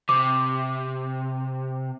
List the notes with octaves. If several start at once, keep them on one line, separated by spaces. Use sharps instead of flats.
C3 D6